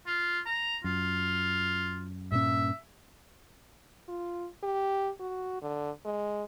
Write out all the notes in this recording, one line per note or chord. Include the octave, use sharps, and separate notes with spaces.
F4
A#5
F#2 F4
G2 A#2 C#4 E5
F4
G4
F#4
D3
G#3